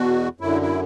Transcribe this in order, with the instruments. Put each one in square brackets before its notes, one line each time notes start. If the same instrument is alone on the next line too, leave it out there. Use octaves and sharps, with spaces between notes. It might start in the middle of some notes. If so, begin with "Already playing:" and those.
Already playing: [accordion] E2 B2 F#4
F#2 D3 E4
E4